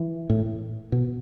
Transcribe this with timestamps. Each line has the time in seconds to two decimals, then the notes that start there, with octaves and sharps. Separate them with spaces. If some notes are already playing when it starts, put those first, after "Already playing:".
Already playing: E3
0.30 A2
0.92 B2